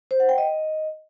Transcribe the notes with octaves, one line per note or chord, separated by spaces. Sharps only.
C5
F#5
G5
D#5